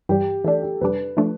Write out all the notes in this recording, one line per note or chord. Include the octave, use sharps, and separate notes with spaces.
G2 E3 G3 G4
E3 A3 D4 A4
G4
F2 C3 G3 D4 B4
F3 A3 D4